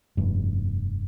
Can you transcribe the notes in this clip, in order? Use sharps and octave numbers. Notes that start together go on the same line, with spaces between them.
F1 G2